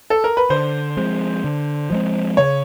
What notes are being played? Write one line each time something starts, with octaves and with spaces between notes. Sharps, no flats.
A4
A#4
B4
D3 C5
F3 G#3 C4
D3
F3 G#3 C4
C#3 C#5